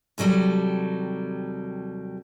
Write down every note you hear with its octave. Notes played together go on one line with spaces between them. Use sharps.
D#2 C3 F#3 G3 A4